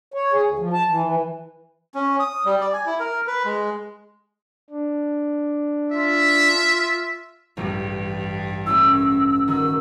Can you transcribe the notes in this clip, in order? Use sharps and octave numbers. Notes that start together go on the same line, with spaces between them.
C#5
G#4
D2
F3
A5
E3
E3
C#4
D#6
G3
D5
G#5
E4
A#4
B4
G#3
D4
F4 E5
A1 G2
A3 C#4 E4 E6
D#3 F#4 E6